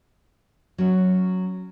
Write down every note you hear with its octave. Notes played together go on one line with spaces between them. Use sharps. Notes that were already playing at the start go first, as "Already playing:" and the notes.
F#3 C#4